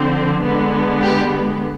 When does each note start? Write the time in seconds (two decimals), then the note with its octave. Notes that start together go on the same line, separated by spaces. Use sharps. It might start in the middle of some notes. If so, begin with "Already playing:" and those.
Already playing: D3 F3 C4
0.41 D3 G#3 B3
1.02 G4